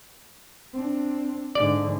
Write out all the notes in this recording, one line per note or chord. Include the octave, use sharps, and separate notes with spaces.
C4 D4
G#2 D3 D5